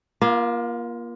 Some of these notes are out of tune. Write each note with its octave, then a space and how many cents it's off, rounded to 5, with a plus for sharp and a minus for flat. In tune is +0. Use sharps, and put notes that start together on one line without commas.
A#3 +30 F4 -15